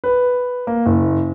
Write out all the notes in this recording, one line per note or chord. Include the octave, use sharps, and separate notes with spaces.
B4
A#3
F#1